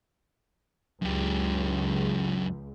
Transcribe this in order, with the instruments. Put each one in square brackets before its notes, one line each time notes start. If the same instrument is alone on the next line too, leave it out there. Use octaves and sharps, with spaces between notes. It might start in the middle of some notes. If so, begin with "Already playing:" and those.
[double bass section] C#2 [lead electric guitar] F#2 G4